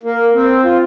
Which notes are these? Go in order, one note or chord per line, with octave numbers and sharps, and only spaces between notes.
A#3
C4
F4